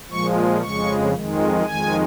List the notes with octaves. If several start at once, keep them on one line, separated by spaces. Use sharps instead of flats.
A#2 F3 G#3 C#6
F2 C#3 G#3 C#6
F2 D#3 G#3
F2 D#3 G#3 G#5